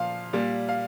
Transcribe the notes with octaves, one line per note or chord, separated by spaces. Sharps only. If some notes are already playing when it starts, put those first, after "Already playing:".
Already playing: A#2 F3 F5
A#2 G3
F5